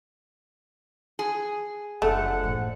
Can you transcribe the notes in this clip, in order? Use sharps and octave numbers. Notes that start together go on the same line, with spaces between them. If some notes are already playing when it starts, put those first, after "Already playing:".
G#4
F#1 F2 D3 A3 F#5
E2 A2